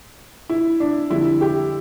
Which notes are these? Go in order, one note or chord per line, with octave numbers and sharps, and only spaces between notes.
E4
D4
F2 D3 G3 E4
G4